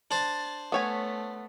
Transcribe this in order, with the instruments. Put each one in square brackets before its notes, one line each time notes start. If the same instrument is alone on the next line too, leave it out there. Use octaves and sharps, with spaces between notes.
[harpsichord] D4 C5 [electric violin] A6
[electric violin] A3 [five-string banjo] B3 C#5 G#5